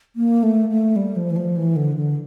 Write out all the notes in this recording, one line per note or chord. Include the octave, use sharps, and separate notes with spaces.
A#3
A3
A3
G3
F3
E3
F3
E3
D3
D3